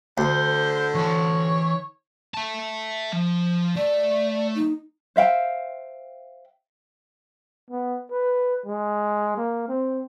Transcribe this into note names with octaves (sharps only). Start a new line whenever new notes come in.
D2 D3 C5
E3 C#5 A5
E5 A5
F3
A3 D5
D#4
C5 E5 F5 G5
B3
B4
G#3
A#3
C4